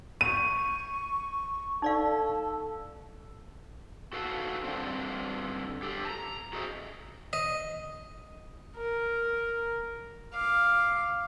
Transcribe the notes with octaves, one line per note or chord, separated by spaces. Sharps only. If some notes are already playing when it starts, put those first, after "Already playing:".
C#6 D#7
D#4 A4 D5 F5
F#4 A4 B4 F5 F#5 A5
G2 D3 F3 C4
G4 A4
A5 A#5
F#4 G#4 A4 C5 D#5 E5
D#5
A#4
F5 D6